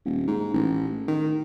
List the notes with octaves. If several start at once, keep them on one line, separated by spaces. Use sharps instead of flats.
D#1
G#2
A1
D#3